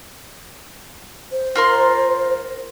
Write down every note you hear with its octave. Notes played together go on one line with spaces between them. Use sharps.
C5
F4 A#4 C6